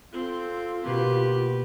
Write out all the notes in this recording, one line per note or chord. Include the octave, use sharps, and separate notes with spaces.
C4 F4 A4
B2 A#3 G4 B4